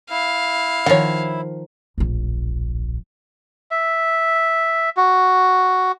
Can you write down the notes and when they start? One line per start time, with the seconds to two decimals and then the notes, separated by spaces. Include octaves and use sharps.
0.10 E4 F5
0.86 D#3 F3 C#5 F#5
1.98 D1 A#1
3.71 E5
4.97 F#4